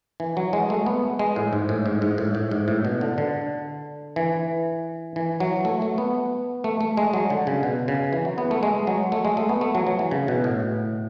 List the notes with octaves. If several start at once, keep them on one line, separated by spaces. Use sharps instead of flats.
E3
F#3
G#3
A3
B3
G#3
A2
G#2
A2
G#2
G#2
A2
A2
G#2
A2
B2
D3
D3
E3
E3
F#3
A3
A3
B3
A3
A3
G#3
F#3
D3
C#3
B2
C#3
E3
F#3
B3
A3
G#3
F#3
A3
G#3
A3
B3
A3
F#3
F#3
E3
C#3
B2
A2